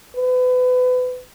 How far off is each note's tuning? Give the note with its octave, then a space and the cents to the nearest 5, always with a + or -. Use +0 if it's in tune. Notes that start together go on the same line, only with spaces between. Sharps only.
B4 +30